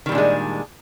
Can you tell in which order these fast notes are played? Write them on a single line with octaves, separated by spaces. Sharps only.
D#3 G3 A#2 D4 G#3